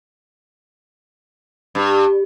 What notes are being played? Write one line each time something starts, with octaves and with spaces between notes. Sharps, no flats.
G2